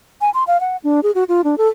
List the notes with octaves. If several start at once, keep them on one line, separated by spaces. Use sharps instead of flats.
G#5
C6
F5
F#5
D4
G#4
F#4
F4
D4
A4